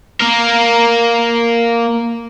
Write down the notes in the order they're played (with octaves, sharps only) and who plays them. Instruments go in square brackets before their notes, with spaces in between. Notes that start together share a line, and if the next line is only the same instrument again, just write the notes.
[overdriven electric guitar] A#3 A#4